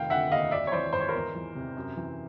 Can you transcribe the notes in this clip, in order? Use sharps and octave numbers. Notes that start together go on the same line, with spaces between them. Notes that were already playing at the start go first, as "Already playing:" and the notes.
Already playing: F1 D#3 F5 G5
D3 E5 F#5
D#2 D#5 F5
G#1 D5 E5
C#5
E3 C5 D5
G#2 C5
C#5
A#4 C5
E2
E3
C3
F#2
E3